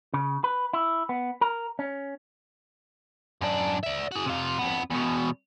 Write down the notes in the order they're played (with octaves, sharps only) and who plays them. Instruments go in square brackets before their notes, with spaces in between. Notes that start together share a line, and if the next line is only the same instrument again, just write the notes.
[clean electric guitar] C#3
B4
E4
B3
A#4
C#4
[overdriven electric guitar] F#2 D4
D5 E5
F#4 G#4
C3 F4
F2 B3
E2 B2